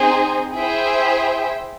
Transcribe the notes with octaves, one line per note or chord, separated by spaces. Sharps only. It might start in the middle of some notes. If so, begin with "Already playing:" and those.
Already playing: C4 D#4 G#4 C5
E4 G#4 C5 E5 G5